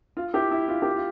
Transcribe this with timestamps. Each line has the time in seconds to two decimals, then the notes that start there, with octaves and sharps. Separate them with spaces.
0.17 F4
0.34 E4 G4
0.51 E4
0.68 F4
0.82 G4
0.96 F4